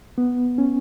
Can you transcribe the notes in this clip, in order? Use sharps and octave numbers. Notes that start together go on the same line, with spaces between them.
B3
C#4